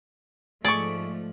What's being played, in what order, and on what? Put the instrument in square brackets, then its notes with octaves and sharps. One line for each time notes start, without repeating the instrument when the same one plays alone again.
[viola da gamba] G#2 F3 [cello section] A3 [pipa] G#4 C#6 [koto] D5